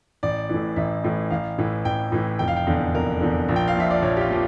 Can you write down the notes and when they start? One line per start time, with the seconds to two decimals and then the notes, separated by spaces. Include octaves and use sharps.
0.23 A1 D5
0.49 A2 E3
0.76 A1 E5
1.04 A2 E3
1.30 A1 F5
1.58 A2 E3
1.85 A1 G5
2.12 A2 E3
2.39 F1 G5
2.48 F5
2.56 G5
2.67 E2 D3
2.95 F1 A#4
3.21 E2 D3
3.48 A#1
3.56 G5
3.68 F5
3.75 A#2 F3 E5
3.91 D5
4.02 A#1 C#5
4.17 G4
4.21 F4
4.30 A#2 F3